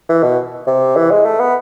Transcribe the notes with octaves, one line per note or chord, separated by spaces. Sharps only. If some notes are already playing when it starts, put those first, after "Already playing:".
E3
B2
C3
E3
G#3
A3
B3